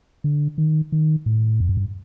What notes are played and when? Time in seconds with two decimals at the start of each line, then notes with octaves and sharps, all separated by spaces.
0.24 D3
0.58 D#3
0.92 D#3
1.26 A2
1.60 F2
1.69 F#2
1.77 G2